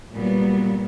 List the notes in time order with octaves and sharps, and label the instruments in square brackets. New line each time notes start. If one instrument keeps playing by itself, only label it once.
[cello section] A#2 F#3 G3 B3